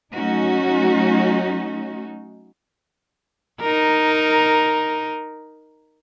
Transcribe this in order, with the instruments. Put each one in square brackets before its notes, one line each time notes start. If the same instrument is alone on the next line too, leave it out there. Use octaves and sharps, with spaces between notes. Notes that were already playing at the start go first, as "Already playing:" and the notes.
[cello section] F#3 A3 C#4 D#4 F#4
[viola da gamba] D#4 A#4